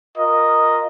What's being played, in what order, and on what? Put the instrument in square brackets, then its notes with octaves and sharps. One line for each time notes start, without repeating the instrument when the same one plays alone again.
[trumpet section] F4 A#4 D#5